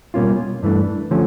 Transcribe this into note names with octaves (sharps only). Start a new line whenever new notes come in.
B2 G3 A#3 C#4 F4
G2 E3 A3 D4
D3 F3 A3 C#4